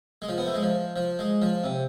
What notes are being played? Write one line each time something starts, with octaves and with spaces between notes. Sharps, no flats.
G#3
F3
B3
A3
G#3
F3
F3
G#3
F3
C3